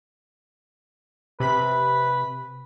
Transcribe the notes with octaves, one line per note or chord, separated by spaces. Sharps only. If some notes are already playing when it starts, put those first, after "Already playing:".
C3 B4 B5 B6